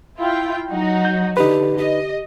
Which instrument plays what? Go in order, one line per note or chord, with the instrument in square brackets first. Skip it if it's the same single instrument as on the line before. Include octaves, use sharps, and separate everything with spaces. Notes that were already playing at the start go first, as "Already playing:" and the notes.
[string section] E4 F4 G5
F#3 D#4 F#4
[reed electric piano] G6
[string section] D3 [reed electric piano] D#4 B4 [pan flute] G4
[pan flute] G4 [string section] D#5